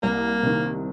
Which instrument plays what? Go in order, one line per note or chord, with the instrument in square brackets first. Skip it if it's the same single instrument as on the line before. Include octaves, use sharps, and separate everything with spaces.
[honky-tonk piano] C2 [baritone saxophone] A#3
[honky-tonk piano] C3 D#3